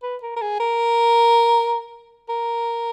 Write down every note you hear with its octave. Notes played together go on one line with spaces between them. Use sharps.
B4
A#4
A#4
G#4
A#4
A#4